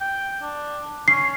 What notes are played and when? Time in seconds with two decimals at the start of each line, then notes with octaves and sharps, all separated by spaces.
0.01 G5
0.42 D4
1.08 C#4 C7